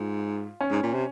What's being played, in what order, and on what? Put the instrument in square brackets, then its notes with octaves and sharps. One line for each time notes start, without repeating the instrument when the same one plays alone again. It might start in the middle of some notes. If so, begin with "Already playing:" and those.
Already playing: [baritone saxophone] G#2 [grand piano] F4
[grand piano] C#4
[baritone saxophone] G#2
A#2
C3